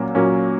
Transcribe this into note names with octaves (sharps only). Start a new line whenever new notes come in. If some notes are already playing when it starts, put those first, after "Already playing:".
Already playing: A#2 F#3 A#3 C#4
A#2 F#3 A#3 C#4